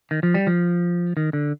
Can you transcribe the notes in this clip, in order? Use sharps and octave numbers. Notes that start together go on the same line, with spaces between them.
D#3
F3
G3
F3
D#3
D3